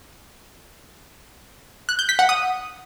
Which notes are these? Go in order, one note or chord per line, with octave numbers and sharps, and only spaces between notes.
F#6
G6
B6
F#5
D#6